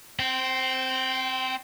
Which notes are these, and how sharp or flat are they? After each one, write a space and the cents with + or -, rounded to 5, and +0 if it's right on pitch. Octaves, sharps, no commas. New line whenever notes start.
C4 +0 G5 -25